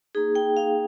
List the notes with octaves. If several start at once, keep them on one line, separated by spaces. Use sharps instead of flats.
A#3 D#4 G#4
G5
A#3 D#4 F5